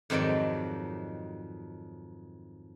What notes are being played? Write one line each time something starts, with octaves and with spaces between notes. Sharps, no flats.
F2 G#2 D#3 F#3 D5